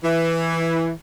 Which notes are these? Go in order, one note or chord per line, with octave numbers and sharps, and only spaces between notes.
E3